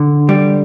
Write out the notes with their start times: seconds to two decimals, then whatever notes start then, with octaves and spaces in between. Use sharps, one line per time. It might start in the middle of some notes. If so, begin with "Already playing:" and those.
Already playing: D3
0.29 G3